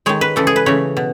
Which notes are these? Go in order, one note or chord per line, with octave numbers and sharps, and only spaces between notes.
D#3 G#3 C#5
B4
C#3 E3 G#3 A4
G#4
B4
C#3 E3 A3 C#5
B2